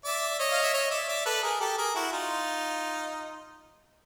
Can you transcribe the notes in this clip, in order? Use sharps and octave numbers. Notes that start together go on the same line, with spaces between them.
D5 E5
C#5 D#5
F5
E5
C#5 D#5
D5 E5
D5 E5
A4 B4
G#4 A#4
G4 A4
G#4 A#4
E4 F#4
D#4 F4